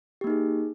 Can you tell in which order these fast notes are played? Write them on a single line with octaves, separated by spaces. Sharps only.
G4 A#3 D#4 G#4